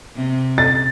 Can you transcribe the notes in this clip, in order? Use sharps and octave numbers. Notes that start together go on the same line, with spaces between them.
C3
A6